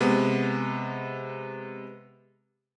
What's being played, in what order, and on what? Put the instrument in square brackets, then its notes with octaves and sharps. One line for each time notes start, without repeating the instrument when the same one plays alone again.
[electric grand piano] C3 G#3 B3